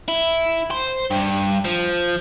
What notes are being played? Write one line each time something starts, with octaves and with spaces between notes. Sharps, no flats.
E4
C5
G2
F3